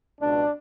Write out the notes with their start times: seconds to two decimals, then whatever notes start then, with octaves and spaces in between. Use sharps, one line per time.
0.21 C#2 B2 D4